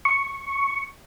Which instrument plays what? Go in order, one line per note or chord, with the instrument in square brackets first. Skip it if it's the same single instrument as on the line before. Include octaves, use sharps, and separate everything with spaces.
[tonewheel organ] C#6